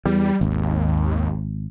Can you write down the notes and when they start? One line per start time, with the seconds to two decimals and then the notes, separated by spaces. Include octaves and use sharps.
0.05 E2 G3
0.41 G#1 D#2